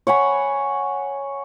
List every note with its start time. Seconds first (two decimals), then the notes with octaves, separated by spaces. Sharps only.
0.07 C#5 F#5 G#5 B5